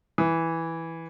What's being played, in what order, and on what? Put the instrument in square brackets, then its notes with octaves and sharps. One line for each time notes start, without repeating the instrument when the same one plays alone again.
[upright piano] E3